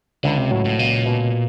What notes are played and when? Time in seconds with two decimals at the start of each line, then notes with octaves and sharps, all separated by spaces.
0.24 C#2 D3
0.37 C3
0.51 A2 F#3
0.65 A2
0.79 C#2 A#2
1.06 B2